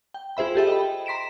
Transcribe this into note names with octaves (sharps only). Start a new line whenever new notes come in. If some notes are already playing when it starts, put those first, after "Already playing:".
G5
F4 G#4 C5 E5 B5
G4 A4 E5 G5
D#5 G5 B5
A#5 C6 B6 D7 E7